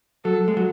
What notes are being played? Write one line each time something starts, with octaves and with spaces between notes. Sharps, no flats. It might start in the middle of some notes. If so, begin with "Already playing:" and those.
F#3 A4
G#3
F#3